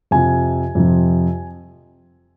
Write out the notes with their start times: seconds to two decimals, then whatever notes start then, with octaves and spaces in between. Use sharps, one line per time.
0.11 F2 C3 F3 G#5
0.75 F2 C3 F3